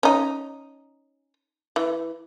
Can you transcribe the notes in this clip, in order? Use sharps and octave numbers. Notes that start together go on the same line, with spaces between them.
C#4 D#4
E3